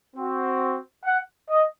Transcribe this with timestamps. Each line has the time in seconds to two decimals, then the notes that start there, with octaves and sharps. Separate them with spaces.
0.16 C4 F#4
1.04 F#5
1.49 D#5